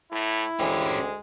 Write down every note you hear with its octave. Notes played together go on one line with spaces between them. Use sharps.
A2 E4
D2 G#3 C#4 G4